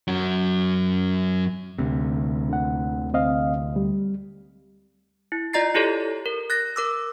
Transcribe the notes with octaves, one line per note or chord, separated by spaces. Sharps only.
F#2 F#4
D2 C3
D3 F#5
C4 D#5 F5
G3
E4
F4 D5 D#5 A#5 A6 C7
E4 F4 G4 A4 C#5
A#4
F#6 A6 A#6
A#4 D6 E6